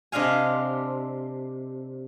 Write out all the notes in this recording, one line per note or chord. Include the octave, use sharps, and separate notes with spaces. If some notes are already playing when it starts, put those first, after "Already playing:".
C3 D4 D#5 F5 G#5